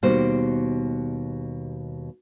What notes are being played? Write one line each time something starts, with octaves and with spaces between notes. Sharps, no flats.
D#2 B2 G3 C5